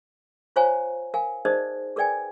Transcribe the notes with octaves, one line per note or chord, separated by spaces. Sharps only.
F4 C5 C#5 F5 G#5 A#5
A#4 F5 G#5
D#4 G#4 A#4 C5 D5 D#5
G#4 A#4 B4 D5 G5 G#5